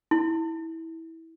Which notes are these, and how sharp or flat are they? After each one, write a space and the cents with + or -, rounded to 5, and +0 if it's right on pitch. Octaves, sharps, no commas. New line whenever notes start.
E4 -20